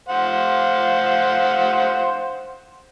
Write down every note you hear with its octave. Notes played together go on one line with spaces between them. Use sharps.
C5 F5 F#5